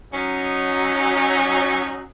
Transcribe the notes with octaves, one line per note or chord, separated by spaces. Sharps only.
F#3 C#4 D#4